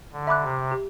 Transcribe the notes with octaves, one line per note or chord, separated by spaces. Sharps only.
D3
E5 B5 D6 F#6
C3
G4